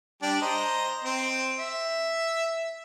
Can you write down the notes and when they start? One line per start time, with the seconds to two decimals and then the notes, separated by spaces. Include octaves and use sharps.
0.22 G3 D4 G4
0.42 C5 D#5 A#5
1.04 C4
1.59 E5